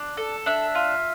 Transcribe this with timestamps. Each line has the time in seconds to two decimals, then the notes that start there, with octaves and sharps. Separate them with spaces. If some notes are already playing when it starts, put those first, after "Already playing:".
Already playing: D4
0.17 A4
0.46 D4 E5
0.75 F4